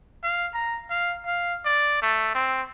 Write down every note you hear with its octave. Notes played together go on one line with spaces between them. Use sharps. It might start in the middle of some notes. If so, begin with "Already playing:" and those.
F5
A#5
F5
F5
D5
A3
C4